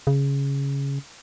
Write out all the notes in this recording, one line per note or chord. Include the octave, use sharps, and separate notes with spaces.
C#3